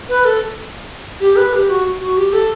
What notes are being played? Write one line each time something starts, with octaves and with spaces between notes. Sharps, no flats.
B4
A4
G4
B4
G4
F#4
F#4
G4
A4